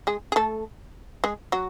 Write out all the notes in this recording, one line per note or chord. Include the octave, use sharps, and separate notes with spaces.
G#3 G#4
G#4
A3 A4
G#3 G#4
F#3 F#4